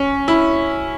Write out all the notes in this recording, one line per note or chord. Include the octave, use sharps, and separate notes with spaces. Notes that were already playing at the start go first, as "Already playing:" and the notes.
Already playing: C#4
E4